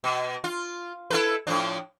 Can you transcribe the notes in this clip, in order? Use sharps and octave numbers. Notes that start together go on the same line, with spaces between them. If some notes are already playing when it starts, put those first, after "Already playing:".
B2
F4
E4 A4 B4
A2 F3 D4